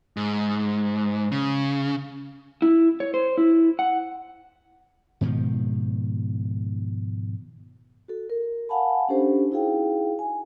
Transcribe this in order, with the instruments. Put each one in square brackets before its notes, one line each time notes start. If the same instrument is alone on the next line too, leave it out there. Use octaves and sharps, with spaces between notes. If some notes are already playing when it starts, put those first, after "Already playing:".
[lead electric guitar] G#2
C#3
[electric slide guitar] E4
C#5
C5
E4
F#5
[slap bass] G#2 B2 D#3 F3
[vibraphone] F#4 A4
A#4
F5 F#5 G#5 A5 B5
C#4 D4 G4 A4 C5
D#4 E4 F#4 G#4 F5 G5
G#5